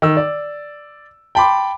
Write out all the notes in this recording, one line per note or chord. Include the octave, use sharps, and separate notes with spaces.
D#3 E6
D5
G5 A5 B5 C6 D6